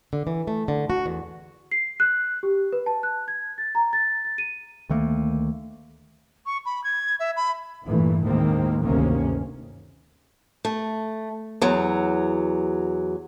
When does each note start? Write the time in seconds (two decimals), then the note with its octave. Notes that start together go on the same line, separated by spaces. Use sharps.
0.13 D3
0.27 E3
0.47 A3
0.68 D3
0.90 F#4
1.06 E2
1.72 C7
2.00 F#6
2.43 G4
2.73 B4
2.86 A5
3.03 F#6
3.28 G#6
3.58 A6
3.75 A#5
3.93 A6
4.25 A6
4.38 D#7
4.90 D2 D#3 A3 A#3
6.46 C#6
6.65 B5
6.84 G#6
7.20 E5
7.36 B5
7.85 G2 A#2 E3 A3
8.23 D#2 A2 D#3 G#3 A#3 C4
8.83 G1 D2 C3 D#3 A#3 C#4
10.65 A3
11.62 E2 F#3